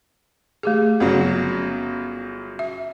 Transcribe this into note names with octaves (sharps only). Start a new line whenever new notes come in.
A3 G4 G#4
G1 C#3 F#3 F#5
E5